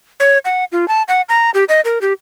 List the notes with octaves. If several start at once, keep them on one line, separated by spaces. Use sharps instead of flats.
C#5
F#5
F4
A5
F#5
A#5
G4
D#5
A#4
G4